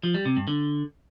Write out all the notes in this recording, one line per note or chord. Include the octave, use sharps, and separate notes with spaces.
F3
G3
C3
G2
D3